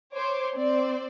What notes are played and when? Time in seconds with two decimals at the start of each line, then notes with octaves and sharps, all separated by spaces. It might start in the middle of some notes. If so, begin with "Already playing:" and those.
0.14 C5 C#5 D6
0.56 C4 C5 D5